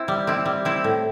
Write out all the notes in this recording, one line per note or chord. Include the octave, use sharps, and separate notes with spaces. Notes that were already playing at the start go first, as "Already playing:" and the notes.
Already playing: C4 E4
G3
C4 E4
G3
C4 E4
A2